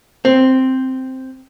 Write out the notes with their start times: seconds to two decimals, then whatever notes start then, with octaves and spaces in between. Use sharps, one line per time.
0.25 C4